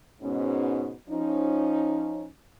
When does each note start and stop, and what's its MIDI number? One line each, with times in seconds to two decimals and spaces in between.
0.22 0.93 44
0.22 0.93 47
0.22 0.93 61
1.10 2.26 53
1.10 2.26 61
1.10 2.26 63